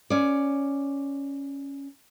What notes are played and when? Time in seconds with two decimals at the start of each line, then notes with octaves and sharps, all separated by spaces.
0.10 C#4 D5